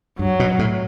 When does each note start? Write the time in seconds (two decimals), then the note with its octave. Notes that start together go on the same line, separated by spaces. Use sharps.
0.19 G2 F#3
0.40 B2
0.59 A2